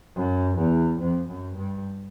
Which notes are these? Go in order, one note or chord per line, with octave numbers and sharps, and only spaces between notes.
F#2
E2
F2
F#2
G2